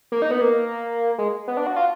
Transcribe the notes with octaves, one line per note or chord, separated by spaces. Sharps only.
A#3
D#4
B3
A#3
G#3
B3
D4
F#4
F4